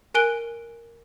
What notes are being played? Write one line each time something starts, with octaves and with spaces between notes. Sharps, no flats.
A#4 G#5 F#6 D7 G7